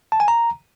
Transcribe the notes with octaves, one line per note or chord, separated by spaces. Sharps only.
A5
G#5
A#5